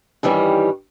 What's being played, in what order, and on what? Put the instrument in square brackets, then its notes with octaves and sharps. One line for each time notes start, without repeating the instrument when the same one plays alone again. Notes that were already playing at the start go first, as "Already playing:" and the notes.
[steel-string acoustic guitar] G2 D#3 E3 G3 C#4